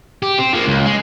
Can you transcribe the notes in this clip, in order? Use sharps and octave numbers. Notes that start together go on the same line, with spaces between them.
G4
C4
F3 A#3
C#2
G#3